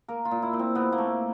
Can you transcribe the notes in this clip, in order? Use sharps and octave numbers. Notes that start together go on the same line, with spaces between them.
A#3 A#4
F4
A#2
E4
A#2
C4
C3 B3
A#3
A3